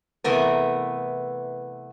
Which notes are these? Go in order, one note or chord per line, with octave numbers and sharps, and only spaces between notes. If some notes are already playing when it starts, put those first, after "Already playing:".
C3 E3 A3 B3 A#4